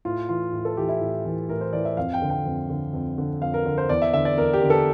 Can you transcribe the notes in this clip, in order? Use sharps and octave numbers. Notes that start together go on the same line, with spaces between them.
A2 F4
E3 F4
A2
A4
E3 G4
E4
A2
E3
A2 A#4
C5
E3 D5
E5
F2 F5
G5
D3
G5
F2
D3
F2
D3
F2 F5
A#4
D3
C5
E2 D5
E5
D3 E5
D5
E2 A#4
G4
D3
A4